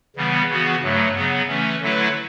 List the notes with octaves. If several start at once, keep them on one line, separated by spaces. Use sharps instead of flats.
C#3 E3 G3 B3
C#3 E3 B3 F#4
G2 F#3 A3
C#3 F#3 B3
E3 A3 C#4
D3 F#3 A3 E4 B4